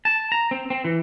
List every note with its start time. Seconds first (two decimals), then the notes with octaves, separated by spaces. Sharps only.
0.05 A5
0.32 A#5
0.51 C4
0.70 C4
0.84 E3